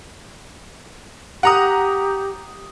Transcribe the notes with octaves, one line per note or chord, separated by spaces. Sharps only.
G4 F#5 A#5 D#6